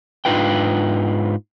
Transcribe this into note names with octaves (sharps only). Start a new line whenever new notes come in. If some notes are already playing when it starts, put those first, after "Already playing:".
G#2 D4 D#4 F4 B4 G5